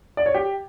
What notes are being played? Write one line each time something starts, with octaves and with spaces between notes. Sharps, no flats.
D5
C#5
G4